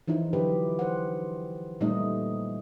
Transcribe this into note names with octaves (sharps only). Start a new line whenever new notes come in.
E3 F3 D#4 E4
D3 F#3 G4 B4
C5 F#5
A#2 G3 A3 C4 D#4 D#5